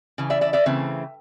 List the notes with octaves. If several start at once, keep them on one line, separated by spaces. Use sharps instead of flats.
C#3 E3
D5 E5
D5 E5
D5 E5
C#3 E3 A3 C4